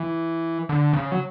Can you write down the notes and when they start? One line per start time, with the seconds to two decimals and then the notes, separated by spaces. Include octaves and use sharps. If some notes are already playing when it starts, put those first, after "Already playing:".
Already playing: E3
0.69 D3
0.93 C#3
1.12 F#3